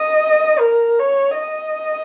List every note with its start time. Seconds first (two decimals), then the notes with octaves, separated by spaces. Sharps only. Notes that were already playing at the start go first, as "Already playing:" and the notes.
Already playing: D#5
0.59 A#4
1.00 C#5
1.40 D#5